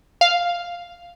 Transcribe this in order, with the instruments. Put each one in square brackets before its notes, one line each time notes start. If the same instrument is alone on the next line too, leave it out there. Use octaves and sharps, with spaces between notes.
[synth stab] F5